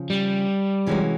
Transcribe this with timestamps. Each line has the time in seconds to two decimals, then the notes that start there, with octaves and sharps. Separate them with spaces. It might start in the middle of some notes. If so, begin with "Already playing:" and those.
Already playing: C#3 F3
0.10 G3
0.86 C3 E3 G#3 C#4 F#4